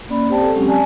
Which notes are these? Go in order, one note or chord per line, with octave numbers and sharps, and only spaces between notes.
A#3 C#4 D5 B5
C4 G4 C5 D5 G5 A5
A4
F#3 G#3 C4 C#4 G4
D5 G#5 A5